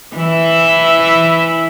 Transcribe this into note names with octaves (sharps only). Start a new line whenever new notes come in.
E3 E4